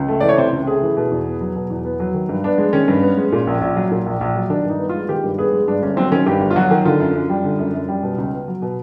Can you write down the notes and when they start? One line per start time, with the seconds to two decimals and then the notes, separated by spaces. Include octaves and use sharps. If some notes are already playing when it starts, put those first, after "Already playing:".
Already playing: C#2
0.08 A3
0.20 E3 D5
0.29 C#5
0.38 C3 C5
0.52 C#2
0.67 A3 G#4
0.82 E3
0.97 B2
1.12 E2
1.26 B3
1.41 F#3
1.55 B2
1.70 E2
1.85 B3
2.00 F#3
2.14 D#3
2.29 G2
2.44 B3 D4
2.58 G#3
2.73 D#3 C#4
2.88 G2
3.02 B3
3.17 G#3
3.32 A#2
3.47 A#1
3.61 A#1
3.76 F#3
3.91 A#2
4.06 A#1
4.21 A#1
4.35 F#3
4.50 D#3 D4
4.65 G2 D#4
4.79 B3
4.89 G#3 F4
5.09 D#3 G4
5.23 G2
5.38 B3 G#4
5.53 G#3
5.68 G2 D4
5.82 G1 C#4
5.97 F#3 C4
6.12 D#3 C#4
6.26 G2 G4
6.41 G1
6.51 F4
6.56 F#3 F#4
6.71 D#3
6.85 D3 F4
7.00 F#2
7.15 F#2
7.30 G3
7.44 D3
7.59 F#2
7.74 F#2
7.88 G3
8.03 B2
8.18 C#2
8.33 B3
8.48 F#3
8.62 B2